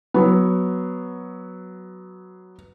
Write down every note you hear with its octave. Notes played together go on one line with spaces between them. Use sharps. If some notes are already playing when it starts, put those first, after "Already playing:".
F#3 B3